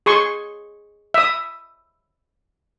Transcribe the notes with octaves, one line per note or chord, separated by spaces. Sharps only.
G#4 C6 C#6
E5 D#6